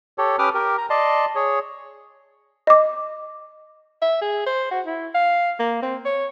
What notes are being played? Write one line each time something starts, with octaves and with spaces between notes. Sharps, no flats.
G4 A4 C#5
C#4 G4 B4 D6 D#6 F6
G4 A#4
A#5
D5 D#5 A5 C6
G#4 C#5
D#5 D6
E5
G#4
C5
F#4
E4
F5
A#3
C4
C#5